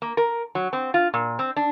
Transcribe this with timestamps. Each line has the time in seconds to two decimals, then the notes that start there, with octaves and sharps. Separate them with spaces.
0.02 A#3
0.17 A#4
0.55 F#3
0.73 C4
0.94 F4
1.14 A#2
1.39 C4
1.56 D4